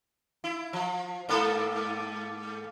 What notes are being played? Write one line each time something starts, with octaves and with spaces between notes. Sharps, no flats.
E4
F3
G#2 A#3 A4